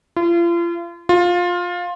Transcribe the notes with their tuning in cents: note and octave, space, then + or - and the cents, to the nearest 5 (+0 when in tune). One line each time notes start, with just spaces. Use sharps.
F4 -40
F4 +15